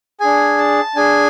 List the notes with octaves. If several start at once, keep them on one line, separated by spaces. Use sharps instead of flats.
D4 G#4 G#5
A5
D4 G#4 G#5